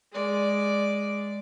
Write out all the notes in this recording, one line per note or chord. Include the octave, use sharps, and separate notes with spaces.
G#3 D5